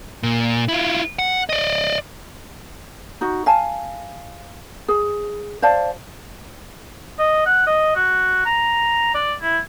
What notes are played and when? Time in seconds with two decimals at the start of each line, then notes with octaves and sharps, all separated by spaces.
0.23 A#2
0.68 E4 F4
1.19 F#5
1.49 D5 D#5
3.21 D#4 F#4
3.46 F5 G#5 A5
4.88 G#4
5.62 C5 D5 F5 A5
7.19 D#5
7.46 F#5
7.66 D#5
7.95 F#4
8.45 A#5
9.14 D5
9.42 E4